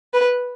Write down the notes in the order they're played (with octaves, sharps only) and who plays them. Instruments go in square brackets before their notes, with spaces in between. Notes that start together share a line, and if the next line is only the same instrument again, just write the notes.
[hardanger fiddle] B4